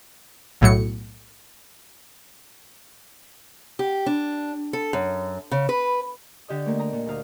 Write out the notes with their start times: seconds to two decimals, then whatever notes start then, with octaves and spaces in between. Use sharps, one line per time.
0.61 B1 A2 F#3 C#7
3.79 G4
4.06 D4
4.73 A4
4.93 F#2
5.51 C#3
5.69 B4
6.48 D3 G4 D#5 D#6
6.66 A3 A#3 A#4
6.79 D#5 A#5
6.93 A#2
7.07 D2 F5 A#5 D#6